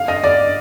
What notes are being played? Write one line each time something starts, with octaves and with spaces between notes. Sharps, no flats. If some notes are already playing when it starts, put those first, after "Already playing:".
Already playing: F5
D#5
D5